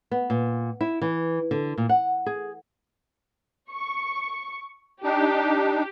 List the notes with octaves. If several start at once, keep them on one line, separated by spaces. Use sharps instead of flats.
B3
A#2
E4
E3
D3
A#2
F#5
G#4
C#6
D4 D#4 G4